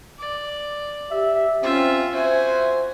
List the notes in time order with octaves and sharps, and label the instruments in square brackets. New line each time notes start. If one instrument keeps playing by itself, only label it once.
[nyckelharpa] D5
[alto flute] G4 [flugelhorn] E5
[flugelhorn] C4 [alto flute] C#4 [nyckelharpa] F4 E5
[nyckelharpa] F#4 G#5 [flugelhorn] C5 [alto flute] E5